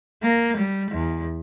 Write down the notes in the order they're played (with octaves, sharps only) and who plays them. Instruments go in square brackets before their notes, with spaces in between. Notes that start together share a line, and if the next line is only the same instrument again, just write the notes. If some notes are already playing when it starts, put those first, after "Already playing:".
[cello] A#3
G3
E2